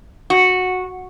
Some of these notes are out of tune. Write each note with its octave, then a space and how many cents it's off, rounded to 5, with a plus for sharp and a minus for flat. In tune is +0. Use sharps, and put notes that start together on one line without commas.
F#4 -10